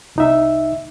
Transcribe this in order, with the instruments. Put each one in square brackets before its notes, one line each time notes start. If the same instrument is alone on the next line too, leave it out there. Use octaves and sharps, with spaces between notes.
[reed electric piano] C2 D#4 E5